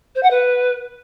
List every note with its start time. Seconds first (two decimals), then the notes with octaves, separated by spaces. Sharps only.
0.15 C5
0.23 F#5
0.31 B4